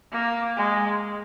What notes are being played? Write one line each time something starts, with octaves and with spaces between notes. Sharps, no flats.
A#3
G#3